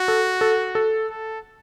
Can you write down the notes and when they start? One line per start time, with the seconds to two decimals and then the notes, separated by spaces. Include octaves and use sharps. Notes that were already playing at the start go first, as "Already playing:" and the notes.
Already playing: F#4
0.08 A4
0.41 A4
0.75 A4
1.09 A4